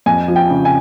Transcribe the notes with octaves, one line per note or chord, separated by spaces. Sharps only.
F2 G#5
F3
G5
C#3
G#5